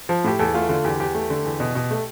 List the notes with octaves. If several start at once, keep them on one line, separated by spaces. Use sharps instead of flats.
F3
A2 G4
E2 A4
A3 F4
D3 F4
E2 G4
E2 G4
A3
D3
E2
B2
B2
A3